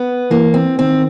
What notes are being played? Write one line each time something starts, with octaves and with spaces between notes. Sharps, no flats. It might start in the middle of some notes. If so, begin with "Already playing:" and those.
Already playing: B3
E3 A#3
C4
D#3 C4